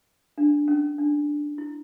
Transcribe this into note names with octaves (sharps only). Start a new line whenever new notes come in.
D4
C#4
D4
E4